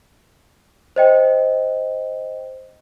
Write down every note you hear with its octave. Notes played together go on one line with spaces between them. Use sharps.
C5 D#5 G5